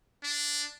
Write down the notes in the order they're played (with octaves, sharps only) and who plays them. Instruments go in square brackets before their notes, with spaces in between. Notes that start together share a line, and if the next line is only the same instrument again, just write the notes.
[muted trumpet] D4